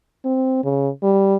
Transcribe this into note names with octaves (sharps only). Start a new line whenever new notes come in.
C4
C#3
G3